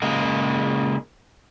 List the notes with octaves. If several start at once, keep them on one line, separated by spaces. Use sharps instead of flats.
C#3 G#3 A#3